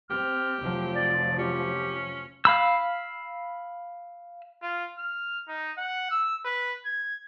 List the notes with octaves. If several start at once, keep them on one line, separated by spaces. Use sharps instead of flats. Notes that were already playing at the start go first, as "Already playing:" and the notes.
C4 G4 F6
F1 F3 F#3
D5
C#4 G4
F5 B5 E6
F4
F6
D#4
F#5
E6
B4
G#6